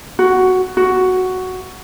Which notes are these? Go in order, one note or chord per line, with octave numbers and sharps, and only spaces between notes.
F#4
F#4